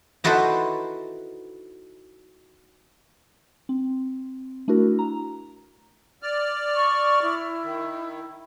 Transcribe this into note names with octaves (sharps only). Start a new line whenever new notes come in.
D#4 E4 F#4 A4 B4 C5
C4
A3 D4 E4 F#4 A#4
A#5
D5 F6
C#6
E4
D#3